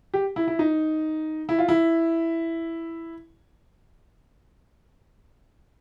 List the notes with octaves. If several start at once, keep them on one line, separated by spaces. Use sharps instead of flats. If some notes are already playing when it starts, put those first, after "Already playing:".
G4
E4
E4
D#4
E4
F4
E4